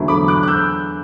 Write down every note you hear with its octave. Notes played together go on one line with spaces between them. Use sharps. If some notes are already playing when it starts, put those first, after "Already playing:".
Already playing: E2 D3 F#3 A3 E4
B5 D6
D6 F#6
F#6
E6 G6